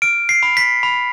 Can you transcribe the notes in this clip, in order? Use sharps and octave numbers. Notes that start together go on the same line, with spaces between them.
F6 D7
C7
B5
B6
B5